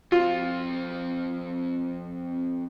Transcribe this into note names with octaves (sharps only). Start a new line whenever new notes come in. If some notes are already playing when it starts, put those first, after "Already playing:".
F2 C4 F4